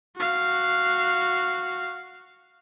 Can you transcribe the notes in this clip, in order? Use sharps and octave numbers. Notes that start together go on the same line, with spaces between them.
F#4 F5